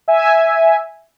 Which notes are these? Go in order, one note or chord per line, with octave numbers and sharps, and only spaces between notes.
E5 G#5